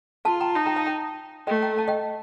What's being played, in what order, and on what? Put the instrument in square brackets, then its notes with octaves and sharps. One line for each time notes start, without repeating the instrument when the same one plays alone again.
[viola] F4 [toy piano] F5 A5
[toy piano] G5 A#5
[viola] D#4 [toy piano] F5 A5
[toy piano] G5 A#5
F5 A5
G5 A#5
[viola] A3 [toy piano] D#5 G5
[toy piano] G5 A#5
F5 A5
D#5 G5